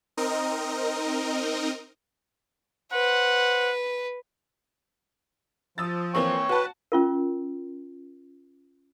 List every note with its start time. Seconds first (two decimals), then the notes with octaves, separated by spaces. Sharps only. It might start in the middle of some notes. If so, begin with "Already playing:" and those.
0.17 C4 D#4 A#4 D#5
2.92 B4 C5 F#5
5.78 F3 D#6 E6 A6
6.15 E3 A#3 C4 C#5 G5 C#6
6.49 F#4 B4 A5
6.92 C#4 F4 A#4